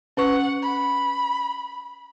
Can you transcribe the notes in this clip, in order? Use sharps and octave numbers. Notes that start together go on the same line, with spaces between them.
C#4 B4 F#5 C#6
B5